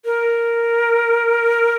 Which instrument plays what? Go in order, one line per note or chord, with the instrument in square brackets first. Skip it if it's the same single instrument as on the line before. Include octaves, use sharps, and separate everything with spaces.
[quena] A#4